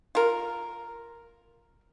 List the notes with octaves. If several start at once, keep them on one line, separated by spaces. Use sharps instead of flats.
F4 A#4